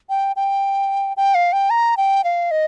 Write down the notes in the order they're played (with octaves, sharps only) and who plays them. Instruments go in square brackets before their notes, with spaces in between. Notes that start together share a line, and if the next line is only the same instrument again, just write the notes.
[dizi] G5
G5
G5
F5
G5
A#5
G5
F5
D#5